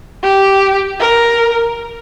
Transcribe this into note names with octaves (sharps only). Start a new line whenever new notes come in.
G4
A#4